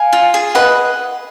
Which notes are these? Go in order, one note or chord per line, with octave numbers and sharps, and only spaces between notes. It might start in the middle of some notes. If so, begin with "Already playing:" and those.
Already playing: F5 G#5
F4
G#4
B4 D#5 F#5